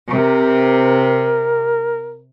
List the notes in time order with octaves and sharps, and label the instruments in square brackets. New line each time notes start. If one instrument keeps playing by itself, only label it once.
[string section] C3 [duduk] A#4